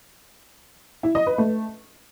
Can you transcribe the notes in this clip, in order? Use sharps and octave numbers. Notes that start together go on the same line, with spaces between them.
E4
D#5
B4
A3